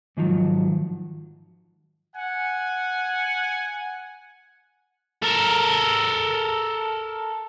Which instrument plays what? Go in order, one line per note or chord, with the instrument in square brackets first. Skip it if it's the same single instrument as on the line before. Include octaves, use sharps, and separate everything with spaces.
[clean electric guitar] G#2 D#3 F3 F#3
[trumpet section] F#5 G#5
[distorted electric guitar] A4 A#4